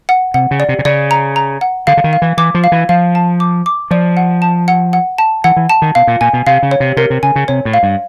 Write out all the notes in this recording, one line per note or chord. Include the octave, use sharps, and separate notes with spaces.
F#5
C3 F#5
C#3
D5
C3
C3
C#3 D5
A#5
A#5
F#5
D3 F5
D3
D#3
F5
E3
E3 D6
F3
F5
E3
F3 F5
A5
D6
D6
F3 D5
F#5
A5
F#5
F#5
A5
E3 F#5
E3
A5
D#3
B2 F5
A#2
A#2 G#5
B2
C3 F5
C#3
C#5
C3
C3 A#4
C3
C#3 G#5
C#3
C3 C#5
A2
F5
G2